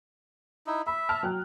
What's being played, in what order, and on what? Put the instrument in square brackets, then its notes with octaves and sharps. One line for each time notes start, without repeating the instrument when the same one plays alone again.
[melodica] D#4 E4
[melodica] E5 [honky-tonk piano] B5
[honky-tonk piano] A5 F6
F#3 G5 F#6